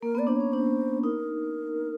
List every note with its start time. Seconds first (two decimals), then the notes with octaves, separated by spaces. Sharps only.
0.02 A#3 A#4
0.15 B3 D5
0.27 D4 C5
0.36 C#4 C#5
0.53 D4 C5
1.04 D#4 A#4